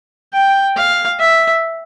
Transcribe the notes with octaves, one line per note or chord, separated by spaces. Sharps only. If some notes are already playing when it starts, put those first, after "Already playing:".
G5
F5
E5